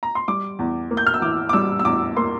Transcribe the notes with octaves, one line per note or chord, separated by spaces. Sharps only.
A#5
C6
G3 D6
E2
A#3
G6
F6
E6
E3 D6
D6
G3 E6
E6
E2 D6
A#3 C6